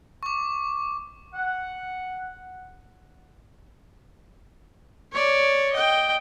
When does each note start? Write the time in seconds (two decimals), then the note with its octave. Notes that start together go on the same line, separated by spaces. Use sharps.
0.23 C#6 D6
1.35 F#5
5.12 C#5 D5
5.72 D#5 G5